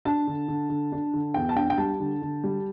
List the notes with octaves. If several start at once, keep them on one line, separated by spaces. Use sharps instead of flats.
D4 A5
D3
D3
D3
D4
D3
E2 G5
A5
D4 G5
G5
G3 A5
D3
D3
G3